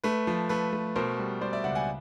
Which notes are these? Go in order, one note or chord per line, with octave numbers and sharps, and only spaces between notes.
A3 B4
F3
A3 B4
A3
B2 A#4 C5
G3
G3 C5 D5
D5 E5
C#2 E5 F#5
F#5 G#5